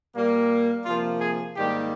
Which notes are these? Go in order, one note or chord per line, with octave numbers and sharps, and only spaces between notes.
A#2 G3 A#3
C3 F3 A#3 F4
G#4
G#2 D#3 G3 A#3 G4